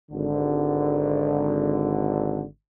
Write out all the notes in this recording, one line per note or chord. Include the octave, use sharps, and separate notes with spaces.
G#1 D3